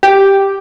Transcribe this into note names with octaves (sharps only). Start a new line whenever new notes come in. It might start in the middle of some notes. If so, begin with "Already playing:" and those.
G4